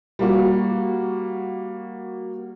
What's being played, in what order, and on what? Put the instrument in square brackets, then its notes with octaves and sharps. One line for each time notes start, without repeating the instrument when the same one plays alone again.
[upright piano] G3 A#3 F#4